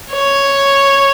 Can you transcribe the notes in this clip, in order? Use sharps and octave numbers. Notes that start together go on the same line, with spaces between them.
C#5